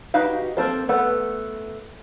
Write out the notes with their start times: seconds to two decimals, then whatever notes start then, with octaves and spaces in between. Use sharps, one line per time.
0.14 D#4 F#4 G4 B4 F5
0.57 A#3 C4 A4 C5
0.89 A3 B3 A4 B4 F#5